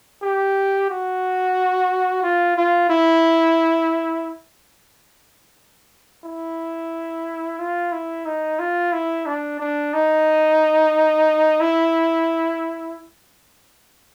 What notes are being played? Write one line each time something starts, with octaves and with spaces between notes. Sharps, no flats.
G4
F#4
F4
F4
E4
E4
F4
E4
D#4
F4
E4
D4
D4
D#4
E4